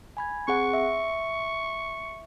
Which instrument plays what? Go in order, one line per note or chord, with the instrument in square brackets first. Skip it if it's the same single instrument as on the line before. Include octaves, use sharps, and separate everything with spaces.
[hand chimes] G#5 B5 G#6
[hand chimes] C4 G#4 F#5 [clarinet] C#6
[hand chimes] E5